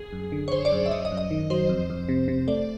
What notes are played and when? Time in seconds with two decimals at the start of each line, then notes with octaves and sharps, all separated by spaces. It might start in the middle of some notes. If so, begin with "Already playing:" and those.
Already playing: G#4
0.13 F#2
0.32 D3
0.48 C#5
0.52 D3 C5
0.65 D5
0.72 F#2
0.86 E5
0.91 F#2 D#5
1.05 D#5
1.12 F#2
1.17 D#5
1.31 D#3
1.50 F#3 C5
1.69 F2
1.90 F2
2.09 C3
2.28 C3
2.48 A3 D5